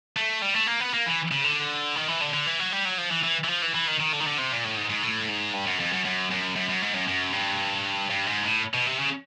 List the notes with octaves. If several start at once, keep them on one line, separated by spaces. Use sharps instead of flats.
A3
G3
A3
A#3
B3
A#3
E3
C#3
D3
D#3
E3
D3
D3
E3
F#3
G3
F#3
F3
E3
E3
E3
F3
E3
E3
D#3
D#3
D3
D#3
D3
C3
A#2
A2
G#2
G#2
A2
G#2
G2
F#2
F2
F#2
F#2
F#2
F#2
F#2
G#2
F#2
F#2
G2
G2
G#2
A2
B2
C3
C#3